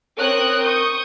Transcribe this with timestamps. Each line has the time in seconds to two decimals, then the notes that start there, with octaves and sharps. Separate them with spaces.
0.19 C4 A#4 C#5 D#6 F#6
0.63 C#6 D#6 G6